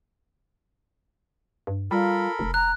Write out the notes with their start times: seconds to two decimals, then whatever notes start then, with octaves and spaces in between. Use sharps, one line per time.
1.67 G2
1.91 G3 F4 A4 A#4 B5
2.39 F1
2.54 A#5 F#6